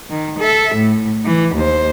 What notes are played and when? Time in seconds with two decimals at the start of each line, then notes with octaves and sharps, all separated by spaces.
0.10 D#3
0.39 A4 E5
0.75 A2
1.25 E3
1.55 D#2 C5